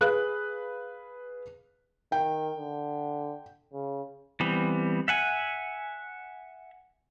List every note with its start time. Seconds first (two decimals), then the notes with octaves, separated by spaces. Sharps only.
0.01 G#4 B4 F5 F#6
2.12 D#3 G5
2.57 D3
3.74 C#3
4.40 E3 G3 B3 C4
5.08 E5 F#5 G#5